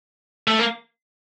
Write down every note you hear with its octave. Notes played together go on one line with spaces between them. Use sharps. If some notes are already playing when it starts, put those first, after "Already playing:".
A3
A#3